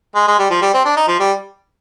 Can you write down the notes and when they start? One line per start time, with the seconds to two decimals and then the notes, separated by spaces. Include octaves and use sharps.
0.15 G#3
0.28 G#3
0.39 G3
0.51 F3
0.62 G3
0.74 C4
0.85 D4
0.97 D#4
1.08 F3
1.19 G3